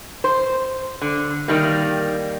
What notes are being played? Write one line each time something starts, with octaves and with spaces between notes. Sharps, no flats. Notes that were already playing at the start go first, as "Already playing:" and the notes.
C5
D3
D#3 G3 A#3